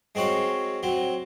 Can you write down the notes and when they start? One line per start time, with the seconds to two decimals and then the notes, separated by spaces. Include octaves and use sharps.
0.15 G#3 C4 F#4 C#5 F5
0.83 F#3 C4